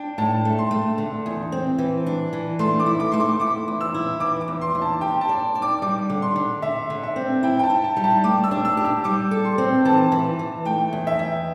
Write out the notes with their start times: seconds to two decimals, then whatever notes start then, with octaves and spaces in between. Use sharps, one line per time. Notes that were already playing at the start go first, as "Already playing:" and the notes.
Already playing: D4 G5
0.18 A2 A5
0.45 A3
0.58 C6
0.71 A3
0.98 D3
1.26 E2
1.52 C4
1.78 E3
2.06 D4
2.33 E3
2.59 A3 C6
2.80 D6
2.86 E4
3.00 D6
3.12 A3 C6
3.20 D6
3.40 E4 D6
3.68 E2
3.81 E6
3.94 E4
4.20 E3 D6
4.41 D6
4.48 E2
4.61 C6
4.75 E2
4.82 A5
5.01 G4 G5
5.21 A5
5.29 D5
5.55 D5
5.62 D6
5.82 G3 D6
6.10 D3
6.22 C6
6.36 D3
6.62 D3 E5
6.90 D3
7.03 E5
7.16 C4
7.43 E4 G5
7.59 G5
7.63 A5
7.70 E4
7.84 A5
7.97 G3
8.04 A5
8.24 A3 D6
8.44 E6
8.51 D4
8.65 E6
8.77 G4
8.85 E6
9.04 G3 D6
9.31 A4
9.45 C6
9.58 C4
9.85 E3 A5
10.12 E3
10.39 E3
10.65 A3 G5
10.93 E2
11.07 E5
11.19 E2